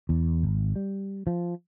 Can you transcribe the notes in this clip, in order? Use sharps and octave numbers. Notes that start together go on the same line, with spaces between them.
E2
G#1
G3
F3